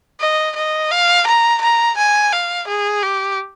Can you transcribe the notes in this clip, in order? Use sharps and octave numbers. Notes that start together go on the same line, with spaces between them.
D#5
D#5
F5
A#5
A#5
G#5
F5
G#4
G4